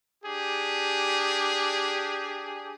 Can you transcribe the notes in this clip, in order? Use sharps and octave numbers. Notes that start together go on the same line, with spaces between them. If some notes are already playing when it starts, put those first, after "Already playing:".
D4 G4 G#4